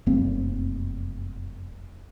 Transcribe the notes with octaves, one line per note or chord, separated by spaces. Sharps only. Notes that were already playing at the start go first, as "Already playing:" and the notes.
F1 F#2 A#3 C4